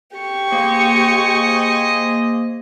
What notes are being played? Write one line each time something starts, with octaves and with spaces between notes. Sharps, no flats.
G4 C#6
A#3 G#4 C5 D#5